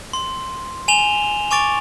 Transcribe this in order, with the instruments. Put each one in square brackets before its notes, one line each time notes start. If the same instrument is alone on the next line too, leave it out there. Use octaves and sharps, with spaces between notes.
[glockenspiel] C6
G#5 E7 F7 G7
G#5 C#6 D6 A6 D7 F7